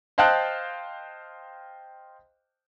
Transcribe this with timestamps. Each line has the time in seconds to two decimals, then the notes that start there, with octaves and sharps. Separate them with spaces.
0.18 C5 D#5 F5 G5 A5 F#6